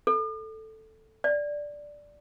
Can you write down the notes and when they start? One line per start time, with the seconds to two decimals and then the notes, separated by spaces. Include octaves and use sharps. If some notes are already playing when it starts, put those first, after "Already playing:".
0.07 A4
1.24 D5